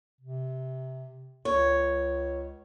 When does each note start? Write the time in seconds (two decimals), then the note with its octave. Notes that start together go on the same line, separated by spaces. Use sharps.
0.20 C3
1.45 C#2 C#5